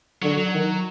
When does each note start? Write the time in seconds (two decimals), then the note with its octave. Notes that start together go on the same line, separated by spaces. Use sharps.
0.23 D3 F#3
0.38 F#3
0.53 D#3